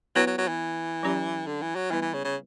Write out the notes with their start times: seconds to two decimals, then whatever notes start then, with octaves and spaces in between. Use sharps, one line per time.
0.16 F#3 B3 E4 B4
0.27 F#3
0.38 F#3
0.48 E3
1.03 F#3 C#4 G4 D5
1.47 D3
1.62 E3
1.76 F#3
1.90 E3 G3 B3 E4 B4
2.02 E3
2.13 C#3
2.24 C#3